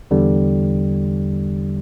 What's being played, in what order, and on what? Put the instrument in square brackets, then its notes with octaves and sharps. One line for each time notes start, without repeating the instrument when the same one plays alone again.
[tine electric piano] E2 D3 G3